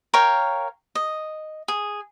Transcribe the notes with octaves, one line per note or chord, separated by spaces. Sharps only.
A#4 C#5 F5 G5
D#5
G#4